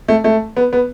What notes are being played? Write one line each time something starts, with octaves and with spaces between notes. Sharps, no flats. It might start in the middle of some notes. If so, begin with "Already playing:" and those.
A3
A3
B3
B3